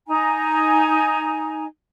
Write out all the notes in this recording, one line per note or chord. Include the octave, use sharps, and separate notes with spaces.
D#4 G#5 A#5